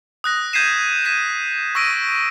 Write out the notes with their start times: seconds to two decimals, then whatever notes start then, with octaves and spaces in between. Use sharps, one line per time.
0.24 D#6 F#6 A#6
0.53 G6 G#6 B6 C7 D#7 E7
1.05 G#6 B6 D#7 E7
1.75 C#6 E6 A#6 D7 D#7